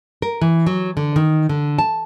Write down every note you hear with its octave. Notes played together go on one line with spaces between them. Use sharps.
A#4
E3
F#3
D3
D#3
D3
A5